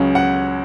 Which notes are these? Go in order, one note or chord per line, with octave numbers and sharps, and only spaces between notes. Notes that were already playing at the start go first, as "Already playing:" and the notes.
Already playing: C#2 C#3 F#3 C#4
F#5